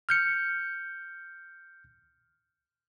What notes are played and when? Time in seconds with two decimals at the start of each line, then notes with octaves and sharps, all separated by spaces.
0.09 F6 G6 C#7